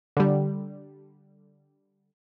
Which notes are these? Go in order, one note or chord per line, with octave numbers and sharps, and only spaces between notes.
D3 G3